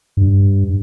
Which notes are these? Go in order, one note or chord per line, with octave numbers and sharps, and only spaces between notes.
G2